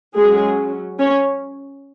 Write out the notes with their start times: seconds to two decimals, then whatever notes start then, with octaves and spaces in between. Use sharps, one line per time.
0.16 F#3 G#3 C#4 G#4
0.99 C#4 C#5